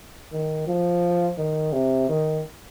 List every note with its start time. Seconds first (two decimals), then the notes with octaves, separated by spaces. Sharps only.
0.33 D#3
0.67 F3
1.38 D#3
1.73 C3
2.09 D#3